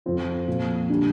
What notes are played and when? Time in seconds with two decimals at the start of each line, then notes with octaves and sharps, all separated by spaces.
0.06 F2 F3 C4
0.48 A#2 F3
0.90 D3 G3 D4